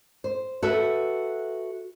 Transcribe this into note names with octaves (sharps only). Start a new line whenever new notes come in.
C5
F#4 A4 B4 E5